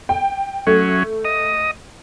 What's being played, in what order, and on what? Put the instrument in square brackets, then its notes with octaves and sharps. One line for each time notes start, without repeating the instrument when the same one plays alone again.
[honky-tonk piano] G5
[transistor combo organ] F#3 C#4 [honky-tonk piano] A3
[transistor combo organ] D#5